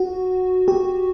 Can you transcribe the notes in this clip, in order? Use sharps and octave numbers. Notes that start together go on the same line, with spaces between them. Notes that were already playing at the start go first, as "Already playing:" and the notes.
Already playing: F#4
G4